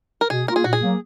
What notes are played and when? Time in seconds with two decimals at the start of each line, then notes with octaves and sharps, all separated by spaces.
0.21 A#4
0.30 B2 G#4
0.48 A#3 F4 A#4
0.56 G#4
0.64 A#2 F#4
0.73 G#4
0.82 F#3 A#3